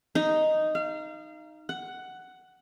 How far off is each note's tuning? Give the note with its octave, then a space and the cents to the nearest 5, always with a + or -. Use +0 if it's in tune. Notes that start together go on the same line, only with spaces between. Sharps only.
D#4 +0
F5 -30
F#5 +10